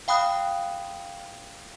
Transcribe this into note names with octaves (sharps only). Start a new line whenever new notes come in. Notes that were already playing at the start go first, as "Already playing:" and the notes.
F5 G5 B5 D#6 F#6